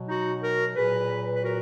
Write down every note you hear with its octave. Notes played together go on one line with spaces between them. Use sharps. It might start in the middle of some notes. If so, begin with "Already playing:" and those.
Already playing: B2 F#3
D#4 F#4
F#4 A#4
A#2 F#3 G#4 B4
B4
F#4 A#4